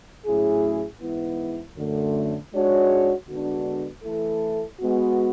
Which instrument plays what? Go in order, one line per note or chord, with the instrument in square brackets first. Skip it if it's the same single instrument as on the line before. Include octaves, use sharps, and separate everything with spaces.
[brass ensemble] A2 F#3 C#4 E4 G#4
G#2 E3 B3 E4
F#2 D3 A3
G#2 G#3 D4 F#4 C#5
D3 G#3 B3 D4 F#4
E3 A3 E4 A4
G#3 B3 F#4